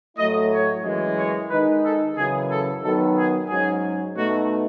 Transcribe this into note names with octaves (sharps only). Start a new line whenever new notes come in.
A2 F#3 A3 E4 D#5
C#5
F#2 E3 G#3
C#5
D#3 G#3 D#4 B4
A4
F#2 C#3 E3 G#4
A4
D#3 F#3 B3 A4
G#4
G#2 F#3 C#4 G#4
B2 A3 D#4 F#4